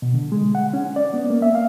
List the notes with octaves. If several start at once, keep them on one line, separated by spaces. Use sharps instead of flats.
B2
D3
G#3
F#5
C#4
D5
B3
A#3
E5
F5